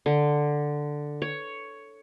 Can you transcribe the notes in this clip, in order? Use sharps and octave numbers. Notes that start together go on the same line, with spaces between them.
D3
C#5